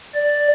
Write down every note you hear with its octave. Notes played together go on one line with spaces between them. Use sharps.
D5